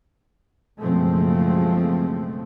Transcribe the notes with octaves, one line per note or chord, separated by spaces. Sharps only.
F#1 B2 F3 G#3 A3 C4